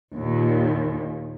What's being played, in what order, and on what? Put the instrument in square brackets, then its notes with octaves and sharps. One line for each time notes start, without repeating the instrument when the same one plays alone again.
[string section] D#2 A#2